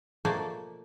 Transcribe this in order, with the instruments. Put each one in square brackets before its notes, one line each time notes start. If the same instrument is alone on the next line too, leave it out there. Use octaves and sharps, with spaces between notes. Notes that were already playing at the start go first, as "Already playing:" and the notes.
[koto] B2 F3 A3 A#3 C5 D5